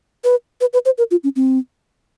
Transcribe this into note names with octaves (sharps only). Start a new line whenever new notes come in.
B4
B4
B4
C5
A#4
F4
C#4
C4